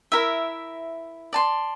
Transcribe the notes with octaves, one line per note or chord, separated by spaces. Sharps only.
E4 A#4 E5
D5 A5 C6